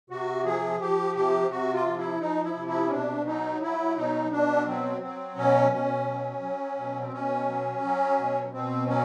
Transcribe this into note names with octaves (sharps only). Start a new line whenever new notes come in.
C3 F#4
F3 G#4
F3 G4
C3 G4
C3 F#4
F4
F3
E4
F3 D#4
E4
C3
E4
C#4
B2 D4
F#3 D#4
F#3 E4
B2 D#4
B2 D4
F#3 C4
F#3 C4
B2 C#4
B2 C#4
F#3
F#3
B2
C4
B2 C#4
F#3
F#3
B2
B2 C4
F#3 C#4